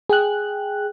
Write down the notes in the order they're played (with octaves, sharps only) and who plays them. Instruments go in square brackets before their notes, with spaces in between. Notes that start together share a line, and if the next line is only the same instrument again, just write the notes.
[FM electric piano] G#4 G5 F#6